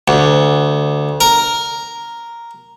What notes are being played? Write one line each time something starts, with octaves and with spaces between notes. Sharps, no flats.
D2
A#4